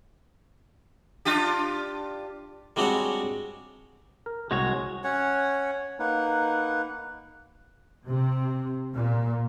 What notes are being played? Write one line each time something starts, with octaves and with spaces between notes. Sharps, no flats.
D4 F4 G4
G3 G#3 C4 D4 F#4 C#5
A#4
C2 G#3 F#4 C5 C#5
C#4 C#5 F#5
A#3 D#4 B4 F#5
C3
A#2